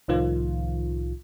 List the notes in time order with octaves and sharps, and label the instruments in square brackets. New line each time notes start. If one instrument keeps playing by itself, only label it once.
[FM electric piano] C2 A2 D#3 F3 F4